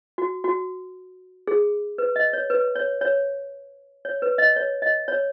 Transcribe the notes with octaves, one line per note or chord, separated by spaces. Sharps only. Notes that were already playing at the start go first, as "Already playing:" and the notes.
F#4
F#4
G#4
B4
D#5
C#5
B4
C#5
C#5
C#5
B4
D#5
C#5
D#5
C#5